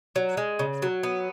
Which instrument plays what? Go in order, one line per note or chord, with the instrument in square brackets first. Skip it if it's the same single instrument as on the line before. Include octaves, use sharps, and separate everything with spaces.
[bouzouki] F#3
G#3
C#3
F#3
B3